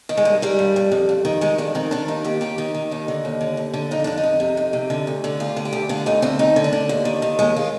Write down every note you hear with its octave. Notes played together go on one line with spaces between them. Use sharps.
D#3
G#3
G2
D#3 G3
G2
G2
F2
F2
D#3
D#3 G#3
F2 D4
D#3 C4
D#3 D4
D#2 D#4
D#2 G4
D#3 G4
D#3 G4
D#3
D#2 D#4
D3
D#2
D3
D#2
D3
F2 D#4
F2 D4
D#4
F2
C3
F2
C3
D3
D2
D3
D2 F4
D3
G4
D2
D3 F4
D2 D#4
D2 C4
D2 D#4
D3
D4
D3
D#2
D#3
D#3
D#2 G#3
F4